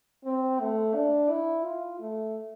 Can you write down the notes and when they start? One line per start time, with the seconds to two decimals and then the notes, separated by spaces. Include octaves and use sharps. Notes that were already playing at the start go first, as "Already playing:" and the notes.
0.25 C4
0.60 A3
0.95 D4
1.30 E4
1.65 F4
2.00 A3